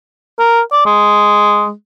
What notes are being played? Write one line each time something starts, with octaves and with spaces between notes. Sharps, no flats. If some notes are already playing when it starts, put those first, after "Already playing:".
A#4
D5
G#3